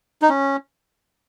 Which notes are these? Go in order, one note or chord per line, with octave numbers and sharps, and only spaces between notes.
D#4
C#4